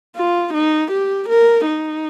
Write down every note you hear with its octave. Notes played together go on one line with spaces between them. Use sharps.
F4
D#4
G4
A#4
D#4